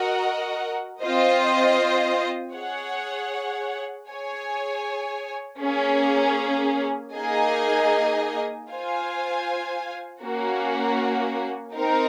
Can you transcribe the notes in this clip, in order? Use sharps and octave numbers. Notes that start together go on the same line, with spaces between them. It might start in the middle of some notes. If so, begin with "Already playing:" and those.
Already playing: F#4 A#4 D#5 F#5
C4 F4 C5 D#5
G#4 C#5 F#5
G#4 C#5 G#5
A#3 C#4 G#4
A#3 D#4 G#4 D#5 G#5
F4 C5 F5 G#5
A#3 C#4 F#4
C4 D#4 A#4